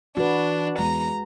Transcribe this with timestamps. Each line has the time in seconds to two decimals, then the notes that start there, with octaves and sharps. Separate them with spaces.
0.17 E3 D4 F#4 B4
0.78 E2 G#3 A#5